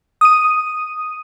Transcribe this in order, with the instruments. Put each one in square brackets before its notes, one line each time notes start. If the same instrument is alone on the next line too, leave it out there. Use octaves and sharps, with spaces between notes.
[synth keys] D#6 D#7